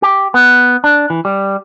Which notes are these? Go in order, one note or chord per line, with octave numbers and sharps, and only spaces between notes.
G4
B3
D4
E3
G3